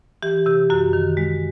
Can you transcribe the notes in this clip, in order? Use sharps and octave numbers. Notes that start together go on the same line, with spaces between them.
E3 G4
C3 G4
F#2 F#4
D#3
G#3